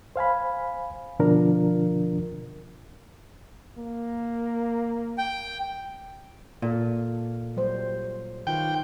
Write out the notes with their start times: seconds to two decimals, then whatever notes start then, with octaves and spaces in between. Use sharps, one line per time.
0.16 C5 F5 G#5 B5
1.20 B2 D3 F3 D4 F4 A#4
3.77 A#3
5.18 G5
6.62 A#2 A4 F5
7.56 F#3 G3 C5
8.47 D#3 F4 G5